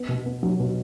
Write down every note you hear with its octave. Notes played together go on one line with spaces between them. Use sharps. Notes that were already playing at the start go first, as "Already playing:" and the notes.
Already playing: B3
B2
B3
F#3
B2